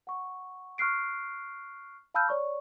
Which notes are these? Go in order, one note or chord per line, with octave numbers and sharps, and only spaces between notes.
F#5 C#6
C#6 F6 F#6 C7 D7
F5 A5 B5 E6 F6 G6
C#5 D5 C#6